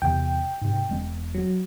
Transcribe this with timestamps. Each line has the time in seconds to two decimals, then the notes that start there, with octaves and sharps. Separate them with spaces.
0.02 E2 C3 G5
0.61 G#2 C3
0.89 E1 G#3 C4
1.34 F#3